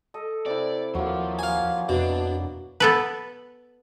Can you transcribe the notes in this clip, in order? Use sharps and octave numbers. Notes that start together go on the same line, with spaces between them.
A4 D#5
C3 E4 D5
D#2 F3 F#3 A#3
F5 G#5
F2 B2 D4
B3 A4 B4